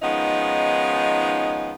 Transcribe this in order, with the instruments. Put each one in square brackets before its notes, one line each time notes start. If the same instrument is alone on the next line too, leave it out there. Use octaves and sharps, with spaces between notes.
[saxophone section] D#3 F3 G#3 B3 C#4 D#4